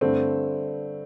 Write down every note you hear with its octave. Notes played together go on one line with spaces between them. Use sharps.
G2 D3 A3 C4